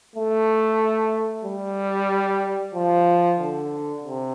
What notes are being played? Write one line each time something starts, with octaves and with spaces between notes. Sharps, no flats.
A3
G3
F3
D3
C3